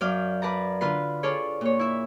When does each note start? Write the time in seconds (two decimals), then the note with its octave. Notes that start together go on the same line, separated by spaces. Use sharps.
0.01 F#2 D5 F5 G6
0.42 B4 D5 A5 A#5
0.81 D3 F4 B4 C6
1.23 F4 G#4 A4 C#5 D5
1.61 A#2 C#5
1.79 E4 E5